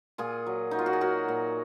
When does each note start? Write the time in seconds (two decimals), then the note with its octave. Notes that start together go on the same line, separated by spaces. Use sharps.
0.18 A#2 F4 G#4
0.47 F#3
0.71 F#3 D#4
0.79 F4
0.86 F#4
0.93 G#4
1.01 F#3 F#4 A#4
1.28 A#2